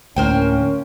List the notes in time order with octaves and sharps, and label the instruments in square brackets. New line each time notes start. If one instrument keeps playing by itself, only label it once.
[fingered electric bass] D2 A2 [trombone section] A#3 C#4 [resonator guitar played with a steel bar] A#4 C5 G5